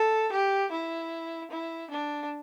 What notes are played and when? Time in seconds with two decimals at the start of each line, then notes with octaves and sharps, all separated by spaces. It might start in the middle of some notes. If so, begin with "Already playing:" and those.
Already playing: A4
0.32 G4
0.72 E4
1.51 E4
1.90 D4